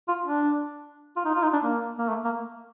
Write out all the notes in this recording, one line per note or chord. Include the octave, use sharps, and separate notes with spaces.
F4
D4
F4
D#4
F4
D#4
D4
A#3
A#3
A3
A#3